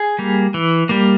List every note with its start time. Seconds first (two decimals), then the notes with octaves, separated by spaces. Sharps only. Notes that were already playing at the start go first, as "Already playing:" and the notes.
Already playing: G#4
0.19 G3 A#3
0.54 E3
0.89 G3 A#3